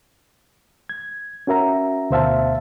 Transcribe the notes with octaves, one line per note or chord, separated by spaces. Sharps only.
G#6
C#4 F#4 A#4 E5 A#5
D2 B2 C5 E5 F5 A5